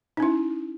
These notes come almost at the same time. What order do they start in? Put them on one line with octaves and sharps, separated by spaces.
D#4 C#4 E4